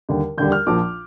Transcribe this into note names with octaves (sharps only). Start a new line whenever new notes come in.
D#2 D3 G3
D#2 D3 G3 G6
F6
A#1 A#2 F3 D6